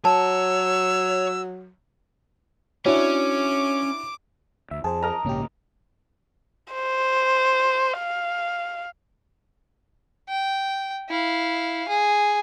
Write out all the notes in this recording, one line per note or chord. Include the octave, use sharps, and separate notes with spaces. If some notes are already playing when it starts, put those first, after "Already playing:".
F#3 C#5 A5 E6
C#4 D4 E4 F#4 C#5 D6
D2 E5
F2 G#4 C5 A5
A#4 D#5 A#5
A#1 G#2 C#3 A#3 C#4 G4
C5
F5
G5
E4 F5
G#4